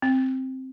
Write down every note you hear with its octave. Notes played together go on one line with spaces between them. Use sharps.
C4